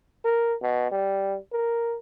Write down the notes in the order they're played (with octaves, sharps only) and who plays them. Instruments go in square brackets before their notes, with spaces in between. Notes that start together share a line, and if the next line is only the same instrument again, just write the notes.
[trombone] A#4
B2
G3
A#4